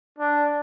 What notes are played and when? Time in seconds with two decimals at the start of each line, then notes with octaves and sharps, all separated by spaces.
0.18 D4